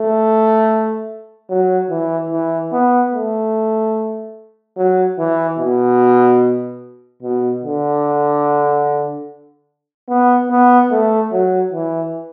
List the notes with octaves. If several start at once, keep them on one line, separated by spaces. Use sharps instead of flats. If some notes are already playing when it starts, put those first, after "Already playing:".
Already playing: A3
F#3
E3
E3
B3
A3
F#3
E3
B2
B2
D3
B3
B3
A3
F#3
E3